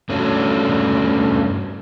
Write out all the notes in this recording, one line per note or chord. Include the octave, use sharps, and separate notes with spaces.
G2 A3 C#4 D4 F#4